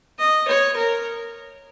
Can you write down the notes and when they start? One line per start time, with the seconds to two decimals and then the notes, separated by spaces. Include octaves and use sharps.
0.18 D#5
0.48 C#5
0.77 A#4